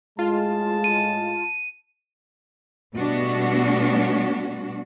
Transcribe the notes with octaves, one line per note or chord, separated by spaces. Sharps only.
A2 G#3 F4 A5
D#7
B2 G3 A3 B3 D4 F#4